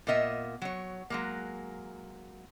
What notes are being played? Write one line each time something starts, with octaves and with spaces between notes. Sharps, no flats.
A#2 B3 A#4 D#5 E5
F#3 C#5
F#3 G#3 A#3